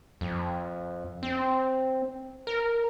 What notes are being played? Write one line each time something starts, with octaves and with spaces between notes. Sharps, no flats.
F2
C4
A#4